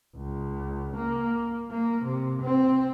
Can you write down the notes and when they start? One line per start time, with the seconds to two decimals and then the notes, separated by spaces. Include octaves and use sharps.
0.16 C#2
0.96 A#3
1.70 A#3
2.04 C3
2.42 C4